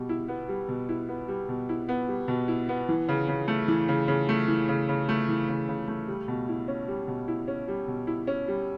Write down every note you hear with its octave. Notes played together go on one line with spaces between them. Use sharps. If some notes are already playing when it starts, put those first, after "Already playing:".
Already playing: B2 G3
E4
B3
G3
B2
E4
B3
G3
B2
E4
B3
G3
B2
E4
B3
E3
C#3
C#3
A3
E3
C#3
C#3
A3
E3
C#3
C#3
A3
E3
C#3
C#3
A3
G3
B2
E4
C#4
G3
B2
E4
C#4
G3
B2
E4
C#4
G3